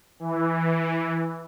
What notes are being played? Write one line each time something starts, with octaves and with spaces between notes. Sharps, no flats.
E3